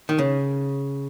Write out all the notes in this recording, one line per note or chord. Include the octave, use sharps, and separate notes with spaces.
D#3
C#3